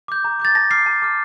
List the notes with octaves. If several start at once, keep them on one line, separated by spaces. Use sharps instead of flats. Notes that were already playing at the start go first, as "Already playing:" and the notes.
D6 G6
A#5
D6 G6 A6
A5 A#6
D6 F6 C7
A5
D6 F6